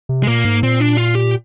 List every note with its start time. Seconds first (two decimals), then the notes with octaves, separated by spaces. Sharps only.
0.09 C3
0.23 G#3
0.27 A#2 A#3
0.45 G#2
0.63 A#2 C4
0.80 D4
0.97 F4
1.15 G4